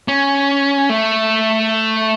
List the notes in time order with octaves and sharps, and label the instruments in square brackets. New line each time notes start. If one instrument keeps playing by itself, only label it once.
[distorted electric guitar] C#4
A3